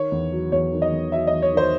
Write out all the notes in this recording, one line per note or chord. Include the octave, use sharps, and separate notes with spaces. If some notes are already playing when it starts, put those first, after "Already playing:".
Already playing: D#3 C#5
E2
F#3
E2 C#5
D#3
D#5
E2
F#3 E5
E2 D#5
C#5
D#3 C5